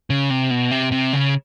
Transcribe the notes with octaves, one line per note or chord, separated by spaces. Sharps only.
C#3
C3
B2
C3
C3
C#3